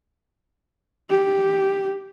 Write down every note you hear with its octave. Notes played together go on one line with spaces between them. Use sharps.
G4